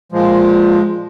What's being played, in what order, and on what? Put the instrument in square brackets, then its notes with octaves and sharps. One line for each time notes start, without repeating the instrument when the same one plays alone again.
[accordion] A#2 F3 G#3